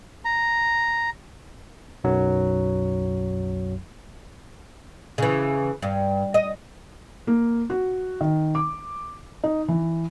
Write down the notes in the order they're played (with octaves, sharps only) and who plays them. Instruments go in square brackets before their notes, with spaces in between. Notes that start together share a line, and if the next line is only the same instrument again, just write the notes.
[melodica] A#5
[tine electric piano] B1 F#2 F#3
[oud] C#3 E3
G2
D#5
[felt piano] A#3
F#4
D#3
D6
D#4
E3